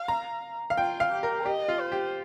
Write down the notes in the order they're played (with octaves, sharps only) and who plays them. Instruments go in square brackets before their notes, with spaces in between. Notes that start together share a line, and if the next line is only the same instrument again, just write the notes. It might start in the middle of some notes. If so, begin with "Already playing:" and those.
Already playing: [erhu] F5
[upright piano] A#5
F5
[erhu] F4 [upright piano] G5
[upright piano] F5
[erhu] G4
[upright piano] A#4
[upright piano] G4 [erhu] D#5
[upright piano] F4
[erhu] C5
[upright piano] G4